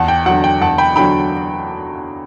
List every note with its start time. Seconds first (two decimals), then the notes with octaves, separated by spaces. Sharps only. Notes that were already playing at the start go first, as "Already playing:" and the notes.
Already playing: E2 F#5 A5
0.08 G5
0.26 D3 F#3 F#5
0.44 G5
0.61 E2 F#5 A5
0.78 G5 B5
0.96 D3 F#3 G5 B5